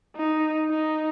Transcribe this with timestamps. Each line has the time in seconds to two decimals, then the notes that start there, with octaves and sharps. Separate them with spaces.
0.16 D#4
0.70 D#4